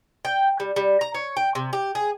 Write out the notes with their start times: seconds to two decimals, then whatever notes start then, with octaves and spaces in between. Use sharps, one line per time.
0.25 G5
0.60 G3
0.76 G3
1.01 A#5
1.14 C#5
1.37 G5
1.55 C3
1.73 G4
1.95 G#4